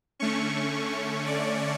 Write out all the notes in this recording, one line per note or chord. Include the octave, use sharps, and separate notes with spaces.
D3 A3 C#4 C#6
C#6
D5